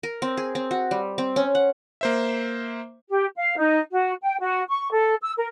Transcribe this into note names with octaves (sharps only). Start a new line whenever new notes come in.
A#4
C4
G#4
C4
F#4
G3
C4
C#4
F#5
A#3 C5 E5
G4
F5
D#4
F#4
G5
F#4
C#6
A4
E6
A#4